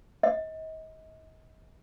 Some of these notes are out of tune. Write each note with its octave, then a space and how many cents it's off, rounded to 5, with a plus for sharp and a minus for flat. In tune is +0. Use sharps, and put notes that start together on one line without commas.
D#5 +35